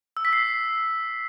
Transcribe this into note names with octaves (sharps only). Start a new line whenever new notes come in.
E6
B6
C7